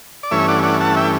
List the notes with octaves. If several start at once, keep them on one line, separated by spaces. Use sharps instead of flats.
D5
G2 E3 A3 C#4 C#5 E5
D5 F#5
D5 F#5
F#5 A5
E5 G5